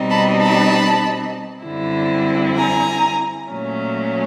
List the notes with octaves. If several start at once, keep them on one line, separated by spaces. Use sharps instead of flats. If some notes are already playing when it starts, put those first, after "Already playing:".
Already playing: B2 G3 C4 D#4
A5 B5
A5 B5
F#2 D3 G3 C4 E4
G#5 A#5
A#2 F#3 A3 C#4